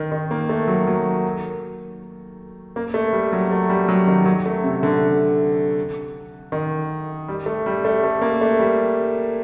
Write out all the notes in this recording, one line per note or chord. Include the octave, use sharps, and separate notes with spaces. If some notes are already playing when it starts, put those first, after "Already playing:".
Already playing: D#3
D#3
A#3
A3
F#3
F#3
A#3
A3
G3
F#3
A3
G3
F#3
D#3
F#3
A3
C3
D3
D#3
G3
A3
G3
A3
A3
A#3
A3
G3